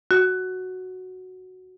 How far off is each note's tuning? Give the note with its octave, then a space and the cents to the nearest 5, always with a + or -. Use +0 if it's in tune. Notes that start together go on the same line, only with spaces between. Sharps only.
F#4 +0